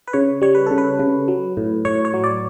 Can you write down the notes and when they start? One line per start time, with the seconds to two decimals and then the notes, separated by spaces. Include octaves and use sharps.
0.08 B4
0.13 C#3 C#5
0.42 G3 C#5
0.55 B4
0.66 C#3 A4
0.78 B4
0.99 C#3
1.28 F#3
1.57 A2
1.85 A2 C#5
2.05 C#5
2.14 F#3
2.24 D5